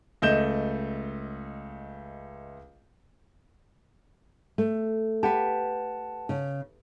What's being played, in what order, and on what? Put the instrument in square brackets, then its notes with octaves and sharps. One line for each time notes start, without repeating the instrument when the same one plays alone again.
[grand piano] C#2 A3 D#5 G6 E7 G7
[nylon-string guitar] A3
[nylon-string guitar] G4 B4 [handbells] F#5 A5
[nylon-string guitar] C#3